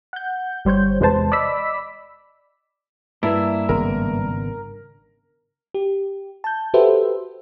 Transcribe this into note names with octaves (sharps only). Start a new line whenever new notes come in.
F#5 G6
G1 G3 C5 C#5 G6
E2 C3 G#3 B4 C5 A5
D5 D#5 B5 D6 E6 B6
G2 A#3 E4 E5
G#1 C#3 B3 A#4
G4
A5 G6
F#4 G4 A4 B4 C5 E5